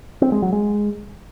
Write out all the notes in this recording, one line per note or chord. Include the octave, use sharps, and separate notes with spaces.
C4
G#3
F#3
G#3